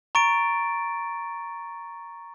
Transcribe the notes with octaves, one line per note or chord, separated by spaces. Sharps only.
A#5 C#6 A6 D7